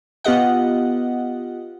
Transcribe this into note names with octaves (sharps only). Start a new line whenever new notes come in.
B3 F4 G4 D#5 F#5